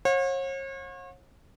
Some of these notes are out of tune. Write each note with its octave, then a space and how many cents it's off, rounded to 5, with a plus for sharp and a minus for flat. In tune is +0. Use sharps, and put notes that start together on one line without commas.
C#5 -40 F#5 -45